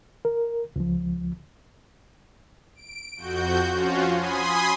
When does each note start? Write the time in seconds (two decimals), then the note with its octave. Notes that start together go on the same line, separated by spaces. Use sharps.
0.25 A#4
0.76 C#2 F3
2.75 D7
3.16 F2 F#4 G6
3.72 F3 C#4 F4 F#4
4.14 G#5 B5 C6 D#6